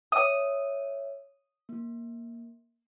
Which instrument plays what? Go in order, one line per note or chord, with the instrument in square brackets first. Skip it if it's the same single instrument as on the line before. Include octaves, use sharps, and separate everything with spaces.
[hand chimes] C#5 E5 [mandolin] D#6
[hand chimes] A#3